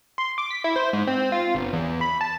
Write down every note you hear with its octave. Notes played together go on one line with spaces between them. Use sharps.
C6
D6
B6
E4
C5
G#2
C4
F4
G1
E2
B5
A5